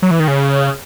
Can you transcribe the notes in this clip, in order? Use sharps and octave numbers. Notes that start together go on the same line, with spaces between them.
F#3
E3
D#3
C#3